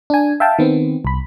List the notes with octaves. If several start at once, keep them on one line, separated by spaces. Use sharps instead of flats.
D4 G#5
E5 F5 G5 A5
D#3 B3 C4
C2 B5